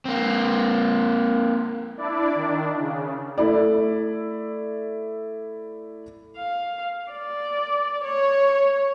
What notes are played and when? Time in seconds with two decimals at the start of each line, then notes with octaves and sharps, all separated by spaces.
0.05 A#3 C4
1.97 D4 E4 D5
2.35 D#3 D4
2.79 C#3
3.38 A3 E4 D5
6.37 F5
7.12 D5
8.04 C#5